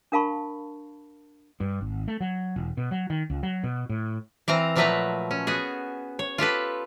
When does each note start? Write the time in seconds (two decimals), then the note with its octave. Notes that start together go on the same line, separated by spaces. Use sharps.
0.12 D4 A#4 F5 A5 B5 C#6
1.60 G2
1.81 G#1
2.08 A3
2.21 F#3
2.56 E1
2.77 B2
2.91 F#3
3.10 D#3
3.30 C#2
3.43 F#3
3.64 B2
3.89 A2
4.48 E3 C4 F5 A#5
4.76 A#2 F3 F#3 A3 B4 A#5
5.31 C#4
5.47 B3 F#4 G#4
6.19 C#5
6.38 F4 G4 A4 B4